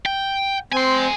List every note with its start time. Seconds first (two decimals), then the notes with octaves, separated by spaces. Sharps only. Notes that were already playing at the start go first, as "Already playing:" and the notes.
0.06 G5
0.73 C4 G#5 C6